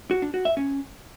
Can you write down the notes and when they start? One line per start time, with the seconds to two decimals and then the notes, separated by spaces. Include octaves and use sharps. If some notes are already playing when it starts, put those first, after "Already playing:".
0.11 F#4
0.22 D4
0.34 F#4
0.45 E5
0.57 C#4